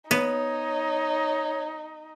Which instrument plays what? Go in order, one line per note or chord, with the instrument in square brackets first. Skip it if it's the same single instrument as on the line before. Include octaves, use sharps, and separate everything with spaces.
[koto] B3 [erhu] D#4 [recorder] C#5